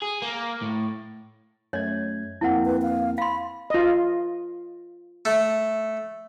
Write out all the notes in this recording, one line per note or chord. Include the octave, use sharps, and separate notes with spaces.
G#4
A#3
A2
F#2 A3 C#5 D#5 G#6
F2 A#3 C4 E4 F#5
B4
F5
F5 B5 C6
F4 D#5
A3